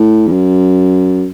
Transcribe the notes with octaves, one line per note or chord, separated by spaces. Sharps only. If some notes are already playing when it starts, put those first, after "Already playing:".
Already playing: A2
E2
F#2